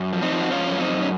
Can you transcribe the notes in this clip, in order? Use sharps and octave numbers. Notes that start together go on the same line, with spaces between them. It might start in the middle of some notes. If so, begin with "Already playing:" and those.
Already playing: F#2
F3
C4 D#4
F3
F#4
F3 C#4 F4
F#2 C#4
C4 D#4
F#2
C#4